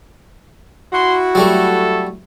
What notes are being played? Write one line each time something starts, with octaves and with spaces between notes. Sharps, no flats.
E4 F#4 C6
F#3 G3 A3 A4